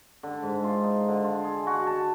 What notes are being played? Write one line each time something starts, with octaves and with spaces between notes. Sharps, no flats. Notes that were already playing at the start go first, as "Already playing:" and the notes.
D3
G#2
F4
D#4
D3
F4
G#4
F#4
A5